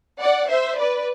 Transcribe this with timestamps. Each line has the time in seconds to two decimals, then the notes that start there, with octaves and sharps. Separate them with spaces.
0.20 D5 F#5
0.49 C5 E5
0.78 B4 D5